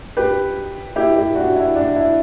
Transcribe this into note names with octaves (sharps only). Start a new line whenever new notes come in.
G4 B4
E4 G4
E4 G4
D4 F#4
E4
D4
E4